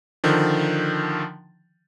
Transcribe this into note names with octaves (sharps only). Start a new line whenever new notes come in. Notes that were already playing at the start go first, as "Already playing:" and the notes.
D3 D#3 F3